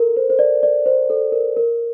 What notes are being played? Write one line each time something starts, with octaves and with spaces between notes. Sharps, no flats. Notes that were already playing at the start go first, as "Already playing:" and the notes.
Already playing: A4 A#4
C5
C5
D5
D5
C5
A4
A#4
A#4